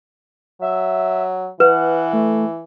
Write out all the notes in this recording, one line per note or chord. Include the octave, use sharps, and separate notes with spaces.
F#3 E5
E3 B4 F#5
A3